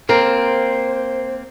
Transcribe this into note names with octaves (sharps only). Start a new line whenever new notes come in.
A#3 C4 A#4 C5